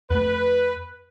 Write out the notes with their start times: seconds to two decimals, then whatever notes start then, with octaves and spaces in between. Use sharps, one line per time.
0.10 F2 A3 B4